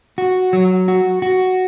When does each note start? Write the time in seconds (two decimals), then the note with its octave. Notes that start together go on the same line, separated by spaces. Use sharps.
0.18 F#4
0.53 F#3
0.88 F#4
1.22 F#4